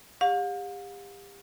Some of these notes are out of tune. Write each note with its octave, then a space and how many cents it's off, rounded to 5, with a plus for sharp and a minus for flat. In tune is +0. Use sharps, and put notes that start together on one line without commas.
G4 +35 F5 +45